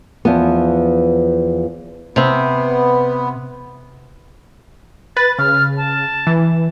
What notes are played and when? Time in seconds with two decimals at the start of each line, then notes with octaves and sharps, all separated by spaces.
0.25 E2 F3 B3
2.16 C3 B3 C4
5.17 B4 A6
5.39 C#3 F6
5.77 A5
6.27 E3